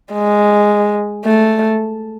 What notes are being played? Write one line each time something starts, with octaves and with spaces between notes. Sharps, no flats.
G#3
A3